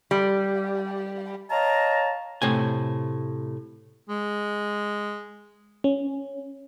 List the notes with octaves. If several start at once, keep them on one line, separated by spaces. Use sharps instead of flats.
G3
C#5 D#5 F5 A5 A#5
A2 C3 G#5
G#3
C#4